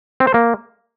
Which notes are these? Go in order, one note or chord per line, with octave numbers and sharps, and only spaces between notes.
C4
C5
A#3